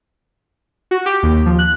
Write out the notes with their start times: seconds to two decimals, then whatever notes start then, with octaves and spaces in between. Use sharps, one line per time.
0.91 F#4
1.06 G4
1.23 D#2
1.46 F3
1.59 F#6